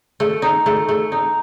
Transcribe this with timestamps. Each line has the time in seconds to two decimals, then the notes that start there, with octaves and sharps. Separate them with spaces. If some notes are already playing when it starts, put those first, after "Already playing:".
0.20 A3
0.42 D#4
0.66 A3
0.89 A3
1.12 D#4